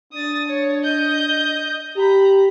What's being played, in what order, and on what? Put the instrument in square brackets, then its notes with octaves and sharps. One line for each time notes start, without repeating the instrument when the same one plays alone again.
[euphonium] D4 [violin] D#6 A6
[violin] C#5
D#5 G6
[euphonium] G4 [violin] A#5 B5